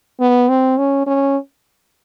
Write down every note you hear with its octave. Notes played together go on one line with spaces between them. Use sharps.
B3
C4
C#4
C#4